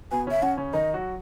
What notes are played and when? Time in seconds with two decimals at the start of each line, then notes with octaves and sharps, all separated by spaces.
0.11 B2 B3 G#5
0.27 C#3 C#4 E5
0.42 C#3 C#4 F#5
0.57 C#3 C#4
0.73 D#3 D#4 D#5
0.94 F#3 F#4